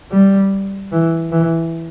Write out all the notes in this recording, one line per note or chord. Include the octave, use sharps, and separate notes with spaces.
G3
E3
E3